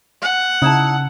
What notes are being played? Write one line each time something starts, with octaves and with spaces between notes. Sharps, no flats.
F#5
C#3 D#4 E4 A5